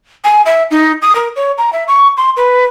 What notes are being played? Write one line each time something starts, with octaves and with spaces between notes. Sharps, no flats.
G#5
E5
D#4
D#6
A#4
C#5
A#5
E5
C#6
C6
B4